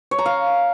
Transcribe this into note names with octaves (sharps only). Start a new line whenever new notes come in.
C#5
A#5
F5